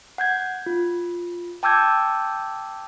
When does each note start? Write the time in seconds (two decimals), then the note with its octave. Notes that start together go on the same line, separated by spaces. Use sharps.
0.18 F#5 G6 G#6
0.66 F4
1.63 G5 A5 D6 E6 G6 G#6